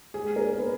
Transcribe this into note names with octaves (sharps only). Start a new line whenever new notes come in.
G#3 G#4
A#4
B3 B4